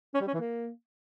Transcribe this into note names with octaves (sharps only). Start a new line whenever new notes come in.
C#4
G3
C#4
E3
A#3